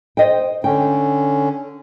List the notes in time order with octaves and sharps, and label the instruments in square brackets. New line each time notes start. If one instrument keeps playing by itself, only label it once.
[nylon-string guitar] C5 D#5 G5
[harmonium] D3 C#4 [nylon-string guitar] G5